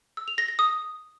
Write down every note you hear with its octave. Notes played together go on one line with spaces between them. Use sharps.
E6
F7
A#6
A#6
D#6